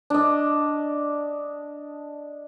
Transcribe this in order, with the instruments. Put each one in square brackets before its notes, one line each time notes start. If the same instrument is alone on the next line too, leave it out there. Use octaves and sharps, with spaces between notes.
[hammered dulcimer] D4 D#5